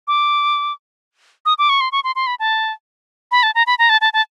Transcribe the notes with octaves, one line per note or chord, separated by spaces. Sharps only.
D6
D#6
D6
C#6
C6
C#6
C6
C6
B5
A5
B5
A5
A#5
B5
A#5
A5
A5
A5